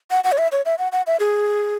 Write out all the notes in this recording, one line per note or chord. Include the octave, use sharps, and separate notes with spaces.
F#5
F#5
C#5
E5
C#5
E5
F#5
F#5
E5
G#4